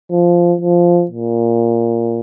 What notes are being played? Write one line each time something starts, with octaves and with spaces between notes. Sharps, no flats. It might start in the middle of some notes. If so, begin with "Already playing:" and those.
F3
F3
A#2